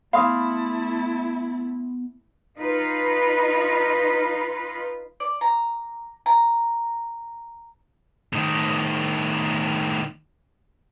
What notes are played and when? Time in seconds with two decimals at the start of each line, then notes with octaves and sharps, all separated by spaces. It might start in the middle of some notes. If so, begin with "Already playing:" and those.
0.13 A3 B3 E4 F5 B5 C6 D#6
2.58 D#4 F4 B4
5.20 D5
5.41 A#5
6.26 A#5
8.33 A2 D#3